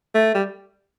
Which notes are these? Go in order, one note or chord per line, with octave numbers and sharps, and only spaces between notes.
A3
G3